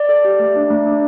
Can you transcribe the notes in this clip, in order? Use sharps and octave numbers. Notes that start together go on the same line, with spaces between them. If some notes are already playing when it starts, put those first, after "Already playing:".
Already playing: D5
A4
G4
A3
D4
A3
D4